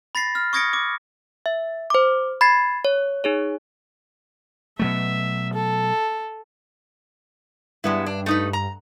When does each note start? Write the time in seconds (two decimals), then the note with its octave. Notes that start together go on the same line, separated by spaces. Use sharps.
0.15 B5 A6 A#6 C7
0.35 F6
0.53 C#6 D#6 G#6 A#6 C#7 D7
0.73 D6
1.46 E5
1.90 C5 D6
2.41 B5 G#6 A6 C7
2.85 C#5
3.24 D#4 G#4 C#5
4.79 B2 F#3 A3 E5
5.53 A4
7.84 G2 G#3 B3 E4
8.06 D4
8.26 A3 D#4 B4
8.53 A#5